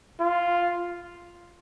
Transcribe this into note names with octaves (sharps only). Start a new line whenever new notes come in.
F4